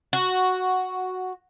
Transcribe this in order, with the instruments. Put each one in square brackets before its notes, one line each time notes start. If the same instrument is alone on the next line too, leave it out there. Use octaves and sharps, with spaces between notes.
[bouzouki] F#4